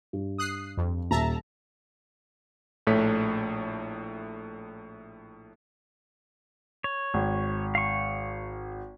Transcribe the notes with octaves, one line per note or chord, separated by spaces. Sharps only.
G2
D#6 F#6 C7
F2
D#1 E5 A5 A#5
A#1 A2 A3 C#5 B6
C#5
G#1
F5 C#6